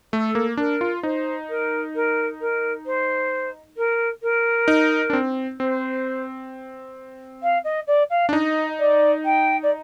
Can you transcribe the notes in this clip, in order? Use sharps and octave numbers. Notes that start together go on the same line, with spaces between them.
A3 A4
A#3
D4 A#4
F4
D#4 C5
A#4
A#4
A#4
C5
A#4
A#4
D#4
D4
C4
C4 C5
F5
D#5
D5
F5
D4
D#4 D#5
D5
G5
D5